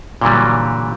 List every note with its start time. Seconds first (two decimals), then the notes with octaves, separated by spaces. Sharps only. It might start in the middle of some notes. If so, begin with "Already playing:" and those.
0.21 A#2 D3 E3 F#3 G3